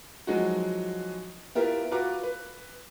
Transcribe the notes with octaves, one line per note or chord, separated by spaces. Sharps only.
F3 F#3 G#3 D#4 F#4
B3 E4 F4 G4 A#4
F4 F#4 B4 A#5 D6
B4